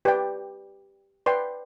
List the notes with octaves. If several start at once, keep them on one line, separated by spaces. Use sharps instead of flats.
G4 B4 D5 G5
B4 D5 G5 C6